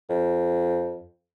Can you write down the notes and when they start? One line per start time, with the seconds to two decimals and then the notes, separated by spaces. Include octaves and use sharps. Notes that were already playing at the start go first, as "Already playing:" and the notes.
0.09 F2